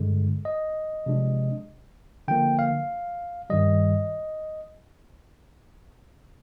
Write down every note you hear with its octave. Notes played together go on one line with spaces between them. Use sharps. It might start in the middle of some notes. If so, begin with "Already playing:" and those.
Already playing: G2 D3 G#3
D#5
C3 F3 G#3 D4
D3 F3 A#3 G5
F5
G2 D#3 G3 D#5